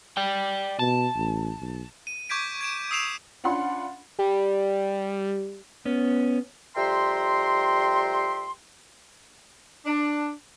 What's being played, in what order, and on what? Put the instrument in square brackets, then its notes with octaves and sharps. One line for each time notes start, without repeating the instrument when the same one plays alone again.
[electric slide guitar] D5 G5
[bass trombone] B2 [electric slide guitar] A5
[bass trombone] A1
B1
[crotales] D#7
C#6 D6 G6 G#6 B6 D7
G#6 D7 E7
D#6 E6 C7 D7 E7 F7
[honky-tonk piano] C#4 D4 F4 F#5 B5 C6
[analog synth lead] G3
[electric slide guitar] B3 C#4
[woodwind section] F2 G3 E5 G5 A#5 C6
[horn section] D4